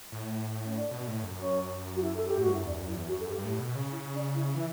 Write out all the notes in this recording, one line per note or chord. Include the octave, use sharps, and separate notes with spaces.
A2
C#4
D4
B2
A2
F#2
C#4
F#4
E4
A4
G4
A2 F#4
G2
F#2 E4
E2 D4
F#2
E4
E2
F#4
F#2
A4
G2 G4
G2
A2
B2
C#3
E4
D4
E4
E3 E4